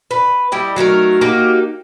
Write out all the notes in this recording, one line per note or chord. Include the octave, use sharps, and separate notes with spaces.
B4
G3 E4 G4 D#5
F#3 A3 D#4 A#4
A#3 D#4 F#4 G4